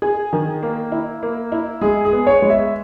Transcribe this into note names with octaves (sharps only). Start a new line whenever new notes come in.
G#4
D#3
A#3
E4
A#3
E4
G#3 G#4
G#4
B3
C#5
G#3
E5